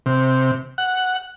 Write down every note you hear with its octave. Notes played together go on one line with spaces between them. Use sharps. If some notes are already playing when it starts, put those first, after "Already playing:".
C3
F#5